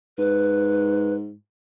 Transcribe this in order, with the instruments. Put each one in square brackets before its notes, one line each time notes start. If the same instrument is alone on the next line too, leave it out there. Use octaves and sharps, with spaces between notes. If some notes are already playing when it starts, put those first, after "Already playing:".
[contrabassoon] G#2 [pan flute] B4